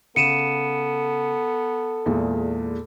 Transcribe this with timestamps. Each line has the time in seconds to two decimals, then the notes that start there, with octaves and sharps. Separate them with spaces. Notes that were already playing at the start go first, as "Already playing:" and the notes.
0.16 C#3 B3 A4 C#7 D#7 E7
2.06 E2 A#2 G#3